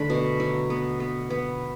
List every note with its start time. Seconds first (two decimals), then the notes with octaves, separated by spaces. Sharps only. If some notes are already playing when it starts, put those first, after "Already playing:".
Already playing: D3 A3 B5
0.10 B2
0.40 F#3
0.70 B3
1.00 B3
1.30 B3